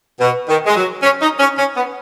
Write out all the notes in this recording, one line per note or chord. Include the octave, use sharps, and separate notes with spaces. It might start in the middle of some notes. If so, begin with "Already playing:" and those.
B2
D#3
G#3
F#3
C#4
D#4
C#4
C#4
B3